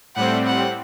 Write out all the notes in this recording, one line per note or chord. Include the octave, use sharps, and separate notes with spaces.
A2 G3 C4 F#5
F#5